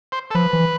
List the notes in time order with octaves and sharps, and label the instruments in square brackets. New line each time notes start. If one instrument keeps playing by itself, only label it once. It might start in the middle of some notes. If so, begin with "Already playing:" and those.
[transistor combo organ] C5
A4
[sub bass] F3 [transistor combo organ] B4
[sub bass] E3